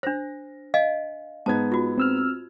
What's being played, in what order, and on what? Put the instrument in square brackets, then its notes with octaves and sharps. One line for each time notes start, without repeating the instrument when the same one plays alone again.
[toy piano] D4 C5 [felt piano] A#6
[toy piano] D#5 F5 G#5
[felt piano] G#2 B3 G#6 [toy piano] A5
[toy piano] F4 F#4
[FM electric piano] C4 E6 F6